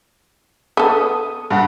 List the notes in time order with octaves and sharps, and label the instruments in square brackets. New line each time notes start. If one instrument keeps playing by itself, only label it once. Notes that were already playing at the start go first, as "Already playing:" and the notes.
[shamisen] B3 A4 [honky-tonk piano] D#6
[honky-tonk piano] G2 F#5